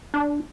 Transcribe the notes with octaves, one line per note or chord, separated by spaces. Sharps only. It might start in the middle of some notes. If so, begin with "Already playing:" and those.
D4